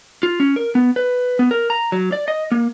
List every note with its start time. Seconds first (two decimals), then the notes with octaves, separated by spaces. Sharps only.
0.23 F4
0.40 C#4
0.56 A#4
0.75 B3
0.96 B4
1.39 B3
1.51 A#4
1.70 A#5
1.92 F#3
2.12 D5
2.28 D#5
2.52 A#3